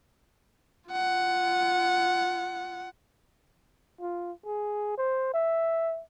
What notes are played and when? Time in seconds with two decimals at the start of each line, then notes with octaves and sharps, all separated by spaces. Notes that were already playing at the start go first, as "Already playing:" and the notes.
0.90 F4 F#5
4.01 F4
4.46 G#4
4.97 C5
5.34 E5